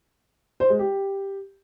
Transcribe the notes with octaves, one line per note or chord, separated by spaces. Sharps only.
C5
G#3
G4